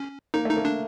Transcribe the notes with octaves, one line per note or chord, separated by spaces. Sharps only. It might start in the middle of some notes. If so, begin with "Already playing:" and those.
Already playing: C#4
A#3 D#4
A3 D#4
A#3
D4